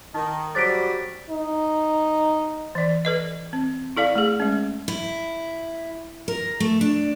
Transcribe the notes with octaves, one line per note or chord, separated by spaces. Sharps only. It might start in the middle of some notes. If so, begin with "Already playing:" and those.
D#3 D#4
F#3 G3 G#4 C5 A6 B6 D7
D#4
E3 D5
A4 B4 D#5
C4
E4 A4 D5 F5
A3 G#4
G#3 C#4
E4
A#4
A3
D4